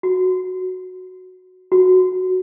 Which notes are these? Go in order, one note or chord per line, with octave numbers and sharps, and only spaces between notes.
F#4
F#4